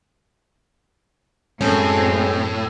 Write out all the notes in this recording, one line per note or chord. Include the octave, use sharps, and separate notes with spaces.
F#2 A2 G#3 C4 C#4